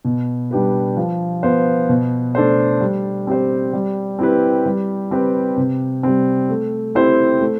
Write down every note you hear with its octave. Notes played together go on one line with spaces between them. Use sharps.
B2
G3 D4 G4 B4
F3
B3 F4 C5
B2
A3 D4 A4 C5
G3
C4 G4 C5
G3
C4 E4 G4 B4
G3
C4 G4 B4
C3
G3 C4
A3
C4 E4 G4 C5
A3